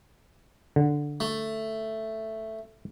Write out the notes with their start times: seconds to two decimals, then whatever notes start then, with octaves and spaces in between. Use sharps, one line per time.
0.76 D3
1.20 A3